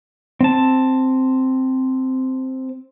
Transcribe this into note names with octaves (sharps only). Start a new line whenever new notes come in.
C4 A5